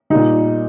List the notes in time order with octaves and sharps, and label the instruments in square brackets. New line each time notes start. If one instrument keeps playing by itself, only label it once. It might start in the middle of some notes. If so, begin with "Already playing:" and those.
[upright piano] A#2 G3 D#4